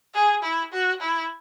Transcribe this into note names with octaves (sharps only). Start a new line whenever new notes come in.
G#4
E4
F#4
E4